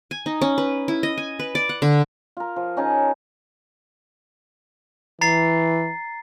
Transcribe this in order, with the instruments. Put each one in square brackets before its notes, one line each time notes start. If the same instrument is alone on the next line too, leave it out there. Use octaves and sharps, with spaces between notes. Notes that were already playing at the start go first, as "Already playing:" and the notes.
[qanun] G#5
D#4
C#4
B4
E4
D#5
G#5
B4
D5
F#5
D3
[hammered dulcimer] F4 A#4
F3
C#4 D#4 G#4 A5
[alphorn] E3 [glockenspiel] A#5 A6 C7